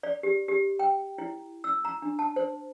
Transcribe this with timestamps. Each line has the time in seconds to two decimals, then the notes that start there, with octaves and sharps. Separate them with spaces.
0.03 D5
0.23 G4
0.48 G4
0.79 G5
1.18 E4
1.64 E6
1.85 A#5
2.02 D4
2.19 A5
2.36 C5